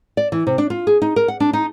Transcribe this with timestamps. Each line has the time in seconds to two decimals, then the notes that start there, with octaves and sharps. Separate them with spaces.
0.17 D5
0.32 E3
0.47 C3
0.58 D4
0.70 F4
0.87 G#4
1.02 D#4
1.16 A#4
1.28 F#5
1.40 D4
1.53 D#4